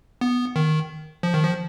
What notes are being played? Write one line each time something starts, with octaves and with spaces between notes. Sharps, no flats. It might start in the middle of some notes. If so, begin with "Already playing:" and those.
B3
D#3
F3
D#3
F3